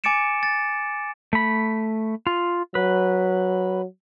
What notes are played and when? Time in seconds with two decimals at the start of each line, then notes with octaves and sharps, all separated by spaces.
0.04 G#5 D6 A6 C#7 D7 E7
0.43 A6
1.33 A3 B5
2.27 F4
2.75 F#3 B4